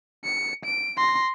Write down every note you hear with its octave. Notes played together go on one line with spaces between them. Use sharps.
C#7
D7
C6 A#6